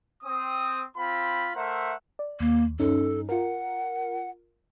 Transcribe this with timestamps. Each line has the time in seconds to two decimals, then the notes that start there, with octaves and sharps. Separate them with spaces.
0.23 C4 D#6
0.97 C4 F4 B5
1.56 A3 A#4 C5 E5 F#5
2.19 D5
2.40 D#2 A#3
2.80 G2 C#4 D#4 A4
3.29 F4 A#4 F#5